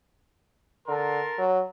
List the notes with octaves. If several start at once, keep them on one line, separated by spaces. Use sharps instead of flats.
D3 A#4 A5 C6
F#3